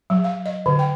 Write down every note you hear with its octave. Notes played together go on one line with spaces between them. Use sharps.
F#3
F5
D#5
D3
G5